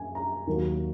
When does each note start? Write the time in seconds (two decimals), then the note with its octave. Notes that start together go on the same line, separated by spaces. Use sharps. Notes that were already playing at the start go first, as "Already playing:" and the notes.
Already playing: F#2 G#5
0.15 A#5
0.47 D#2 D#3 F#3 A#3